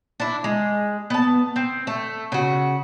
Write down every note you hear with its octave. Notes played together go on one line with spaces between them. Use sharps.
D4 E4
G#3
B3 A5
C4
A3
C#3 F#4